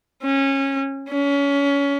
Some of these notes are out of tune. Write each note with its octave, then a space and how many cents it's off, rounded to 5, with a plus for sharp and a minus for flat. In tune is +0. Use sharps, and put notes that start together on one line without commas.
C#4 -20
C#4 +25